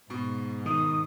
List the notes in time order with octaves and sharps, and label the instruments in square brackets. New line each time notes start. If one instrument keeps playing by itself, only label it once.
[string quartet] G#2 [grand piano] B2
[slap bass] D#3 [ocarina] D#6